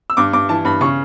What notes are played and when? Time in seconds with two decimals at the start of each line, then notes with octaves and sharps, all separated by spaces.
0.10 E6
0.17 G2 D6
0.33 G2 D6
0.49 E3 A5
0.65 G2 B5
0.81 C#3 C#6